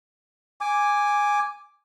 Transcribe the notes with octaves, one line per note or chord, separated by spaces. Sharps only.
G#5 D6